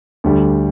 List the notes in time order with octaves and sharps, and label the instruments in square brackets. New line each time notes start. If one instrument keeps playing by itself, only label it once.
[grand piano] D2 D3 G3